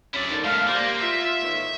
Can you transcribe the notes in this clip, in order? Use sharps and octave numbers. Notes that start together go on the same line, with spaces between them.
C#3 F#3 C#4 E4 D5
G#2 D3 D#3
G#3 A3 F5
A#3 G4 C5 D5
F4 E5
A2 D#3 B3